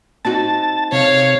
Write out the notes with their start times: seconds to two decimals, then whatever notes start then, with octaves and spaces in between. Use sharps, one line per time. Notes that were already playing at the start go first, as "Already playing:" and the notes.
0.25 C4 D#4 F#4 A5
0.92 C3 C#5 F5